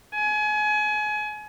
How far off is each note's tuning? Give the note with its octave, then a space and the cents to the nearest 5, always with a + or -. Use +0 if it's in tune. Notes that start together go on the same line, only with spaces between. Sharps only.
G#5 +30